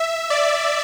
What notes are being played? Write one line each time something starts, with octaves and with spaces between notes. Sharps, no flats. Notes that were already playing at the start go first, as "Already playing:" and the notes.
Already playing: E5
D5